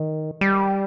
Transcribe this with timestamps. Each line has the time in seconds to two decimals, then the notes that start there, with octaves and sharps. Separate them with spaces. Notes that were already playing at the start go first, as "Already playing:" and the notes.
Already playing: D#3
0.41 G3